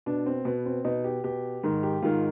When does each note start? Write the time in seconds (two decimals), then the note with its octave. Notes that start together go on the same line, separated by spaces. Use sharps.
0.06 B2 D4
0.26 C4
0.45 B2 B3
0.66 C4
0.85 B2 D#4
1.04 G4
1.24 B2 G4
1.63 G#2 D#3
1.83 G4
2.02 G#2 D#3 F4